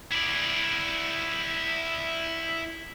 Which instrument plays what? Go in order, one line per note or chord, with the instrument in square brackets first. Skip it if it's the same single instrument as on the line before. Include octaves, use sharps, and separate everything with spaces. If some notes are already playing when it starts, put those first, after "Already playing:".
[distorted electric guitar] E4 D5